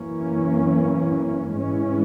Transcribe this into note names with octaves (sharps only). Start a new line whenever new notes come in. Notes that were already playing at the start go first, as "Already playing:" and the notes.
Already playing: F#2 E3 A#3 C#4
G#2 E3 G#3 C#4